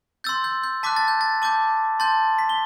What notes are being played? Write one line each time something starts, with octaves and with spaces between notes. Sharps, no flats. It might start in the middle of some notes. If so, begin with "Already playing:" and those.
C6 E6 G6 A6
G6
G6
A5 D6 F#6 B6
A6
G6
A6
A5 D6 G6
A5 C6 G6 A6
B6
G7